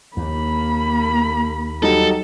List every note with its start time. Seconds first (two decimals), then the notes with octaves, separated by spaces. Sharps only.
0.17 D#2 A#3 B5
1.83 F#3 G3 D#4 A4